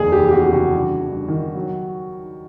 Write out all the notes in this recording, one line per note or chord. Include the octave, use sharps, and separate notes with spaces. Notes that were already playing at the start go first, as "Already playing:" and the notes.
Already playing: F1 D#2 G#4
G4
E3
G4
F#4
C#3 G4
F#4
G2
G2
D#3
F#3